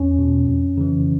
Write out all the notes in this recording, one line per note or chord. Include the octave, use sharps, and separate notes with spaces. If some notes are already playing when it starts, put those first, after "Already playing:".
Already playing: E2 C#4
B2
F2
C#3 E3